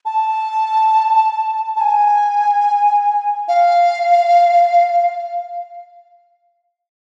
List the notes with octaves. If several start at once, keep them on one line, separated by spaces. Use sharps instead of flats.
A5
A5
G#5
F5